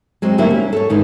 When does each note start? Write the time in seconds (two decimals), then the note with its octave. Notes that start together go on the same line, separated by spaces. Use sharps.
0.22 F#3 G#3 C4
0.38 D3 F#3 G3 A#3 E4
0.51 C#4
0.73 A4 C#5
0.90 G#2 D#3 E3